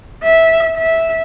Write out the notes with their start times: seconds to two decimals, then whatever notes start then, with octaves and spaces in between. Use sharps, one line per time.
0.23 E5
0.77 E5